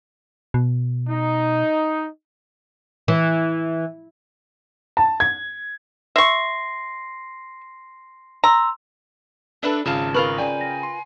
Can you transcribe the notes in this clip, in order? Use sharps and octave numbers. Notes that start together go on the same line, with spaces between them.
B2
D#4
E3
A5
G#6
E5 C6 C#6 A#6 C7
A#5 C6 E6
D4 A4 B4 D5 E5
G#1 C#3 F4 E5 F5 A5
F4 A#4 B4 C#6 F6
C#3 D5 G5 G#5
A#6
C6